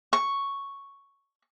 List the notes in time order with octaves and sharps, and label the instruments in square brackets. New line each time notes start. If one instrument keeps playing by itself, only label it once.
[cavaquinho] C#6